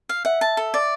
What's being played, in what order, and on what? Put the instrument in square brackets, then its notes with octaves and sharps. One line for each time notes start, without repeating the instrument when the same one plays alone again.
[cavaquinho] F5
[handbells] E5 [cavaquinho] F#5
[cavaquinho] A5
A4
D5